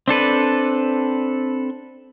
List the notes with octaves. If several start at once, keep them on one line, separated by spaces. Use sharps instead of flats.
C4 D4 A4 B4